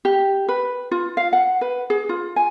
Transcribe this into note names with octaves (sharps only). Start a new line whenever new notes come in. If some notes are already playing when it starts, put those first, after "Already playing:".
G4
B4
F4
F5
F#5
B4
G#4
F4
G#5